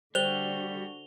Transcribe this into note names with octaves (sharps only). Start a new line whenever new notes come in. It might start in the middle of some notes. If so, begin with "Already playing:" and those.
D3 G3 D4 F#4 C5 F7 G7